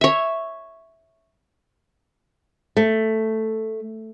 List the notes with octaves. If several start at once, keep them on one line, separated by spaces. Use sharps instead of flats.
C#5 E5
A3